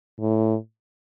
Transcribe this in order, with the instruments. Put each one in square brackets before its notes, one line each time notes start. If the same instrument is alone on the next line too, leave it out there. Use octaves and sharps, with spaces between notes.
[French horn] A2